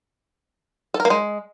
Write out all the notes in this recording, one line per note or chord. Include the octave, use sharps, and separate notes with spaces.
A4
A#4
A#3
G#3